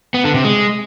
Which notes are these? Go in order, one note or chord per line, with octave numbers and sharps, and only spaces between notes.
B3
D3
C3
G#3